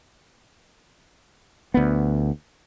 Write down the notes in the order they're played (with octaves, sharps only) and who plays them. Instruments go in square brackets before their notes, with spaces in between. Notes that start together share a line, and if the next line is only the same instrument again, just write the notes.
[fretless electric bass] D2 B3